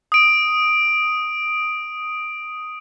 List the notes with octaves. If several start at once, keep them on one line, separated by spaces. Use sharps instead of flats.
D#6 D7